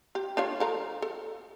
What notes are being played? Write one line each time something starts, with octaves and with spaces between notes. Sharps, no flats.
G4
D4 F4 C#5
F3 A4 A#5
A4